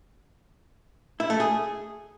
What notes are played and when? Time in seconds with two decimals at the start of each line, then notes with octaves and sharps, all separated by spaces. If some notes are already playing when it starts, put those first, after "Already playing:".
1.20 E4
1.30 A3
1.40 G#4